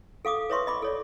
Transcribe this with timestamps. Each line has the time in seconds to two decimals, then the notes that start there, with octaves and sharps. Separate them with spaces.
0.25 A4 F5 D6 D#6
0.50 B4 C#5 E5 C6 C#6
0.67 D#5 B5 D6
0.82 A4 C#5 D5